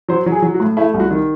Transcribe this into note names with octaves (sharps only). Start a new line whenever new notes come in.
F#3 C5
F#3
G#4
F#3
F#4
A2
A3 E4
C2
F#4
D#3